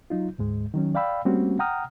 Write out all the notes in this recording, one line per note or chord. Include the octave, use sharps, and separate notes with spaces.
F#3 D#4 F4
D2 G#2 G#3
D#3 F#3 C#4
D5 F5 G5 B5 E6
G3 A3 A#3 C4 C#4 F#4
F#5 G5 A#5 D#6 F6